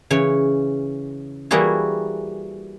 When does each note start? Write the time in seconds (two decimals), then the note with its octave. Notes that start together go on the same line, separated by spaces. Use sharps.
0.10 C#3 E3 C#5
1.51 E3 G3 A#3 E4 F#4 G#4